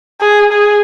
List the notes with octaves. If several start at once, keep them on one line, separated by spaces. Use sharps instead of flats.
G#4
G#4